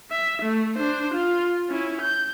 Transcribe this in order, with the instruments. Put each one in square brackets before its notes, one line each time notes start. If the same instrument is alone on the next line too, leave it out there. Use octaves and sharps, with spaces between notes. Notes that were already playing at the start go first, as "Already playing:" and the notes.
[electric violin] E5
A3
D4 C5
F4
C#4 E4
G6